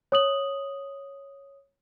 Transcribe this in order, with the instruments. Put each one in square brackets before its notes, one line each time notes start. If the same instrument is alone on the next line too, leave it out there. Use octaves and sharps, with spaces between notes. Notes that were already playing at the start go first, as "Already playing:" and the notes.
[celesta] C#5 D#6 F#7